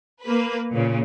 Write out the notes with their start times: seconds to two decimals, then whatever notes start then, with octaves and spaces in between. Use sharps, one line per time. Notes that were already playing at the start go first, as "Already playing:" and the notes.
0.24 A#3 B4
0.72 A#2 C#3